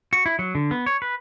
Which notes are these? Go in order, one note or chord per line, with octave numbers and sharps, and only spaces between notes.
F#4
E4
F#3
D3
B3
C#5
B4